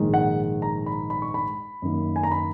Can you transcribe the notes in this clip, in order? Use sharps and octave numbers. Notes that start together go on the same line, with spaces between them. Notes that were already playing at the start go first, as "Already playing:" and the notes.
Already playing: A#1 G#2 D#3 G#3
F#5
A#5
B5
B5
C#6
B5
F#2 D#3 A#3
G#5
A#5
B5